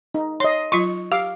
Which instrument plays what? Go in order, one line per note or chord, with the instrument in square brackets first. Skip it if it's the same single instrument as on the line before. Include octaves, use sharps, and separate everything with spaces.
[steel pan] D#4
[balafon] C#5 [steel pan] D#5 C6
[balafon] F#3 F4 C6 [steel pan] C#6
[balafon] G4 [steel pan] F5 D6